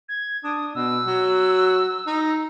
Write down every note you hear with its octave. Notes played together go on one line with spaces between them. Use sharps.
G#6
D4 D#6
B2 E6
F#3
D#4